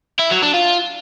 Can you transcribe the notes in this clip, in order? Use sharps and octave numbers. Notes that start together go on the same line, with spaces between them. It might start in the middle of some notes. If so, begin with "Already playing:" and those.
E4
F#3
D4
F4